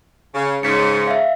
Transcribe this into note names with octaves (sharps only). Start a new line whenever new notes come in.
C#3
G#2 C#3 B6 C#7
E5 F5